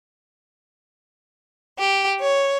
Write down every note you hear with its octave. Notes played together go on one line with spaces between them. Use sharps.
G4
C#5